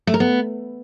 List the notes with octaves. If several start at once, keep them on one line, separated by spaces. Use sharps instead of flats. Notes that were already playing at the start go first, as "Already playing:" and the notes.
A3
A#4
B3